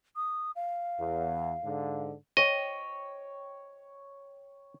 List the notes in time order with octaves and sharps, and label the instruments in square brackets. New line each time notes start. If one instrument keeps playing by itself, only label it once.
[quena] D#6
F5
[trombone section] E2
G#2 D3
[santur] C#5 G5 [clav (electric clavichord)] D#5